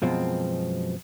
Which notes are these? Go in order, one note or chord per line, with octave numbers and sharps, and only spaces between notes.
F#2 B2 F3 G#3 C4